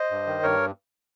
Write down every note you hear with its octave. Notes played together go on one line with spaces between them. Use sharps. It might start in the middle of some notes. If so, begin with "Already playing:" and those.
Already playing: C5 D#5
G2
D#3
G2 A#4 C#5